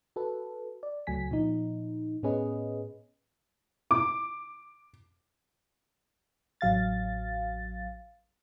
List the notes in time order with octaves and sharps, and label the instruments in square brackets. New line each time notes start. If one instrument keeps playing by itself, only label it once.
[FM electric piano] F#4 A4 B4
D5
C#2 F#3 A3 G#5 B6
A#2 F3 D#4
A2 B3 C#4 G#4 B4 D#5
[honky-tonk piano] D6
[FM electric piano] A1 F#3 F5 A6